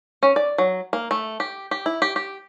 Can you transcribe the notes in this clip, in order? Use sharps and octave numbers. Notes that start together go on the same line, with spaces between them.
C#4
D5
F#3
A#3
A3
G4
G4
E4
G4
G4